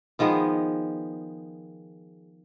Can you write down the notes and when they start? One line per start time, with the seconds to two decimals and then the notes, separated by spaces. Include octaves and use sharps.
0.19 D#3 F3 G#3 B3